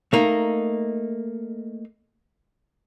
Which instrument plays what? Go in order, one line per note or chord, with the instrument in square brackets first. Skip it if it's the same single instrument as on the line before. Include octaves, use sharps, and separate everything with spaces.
[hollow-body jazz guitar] A3 A#3 D#4